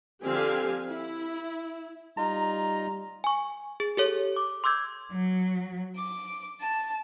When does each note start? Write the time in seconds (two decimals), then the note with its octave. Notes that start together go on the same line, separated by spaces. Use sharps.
0.24 D3 F3 C4 G4 F5 G#5
0.88 E4
2.17 G3 D#4 F4 A#5
3.24 G#5 C#6
3.80 G#4
3.97 G4 A4 C#5
4.36 D6
4.64 C6 D6 E6 G6 G#6
5.11 F#3
5.96 D6
6.61 A5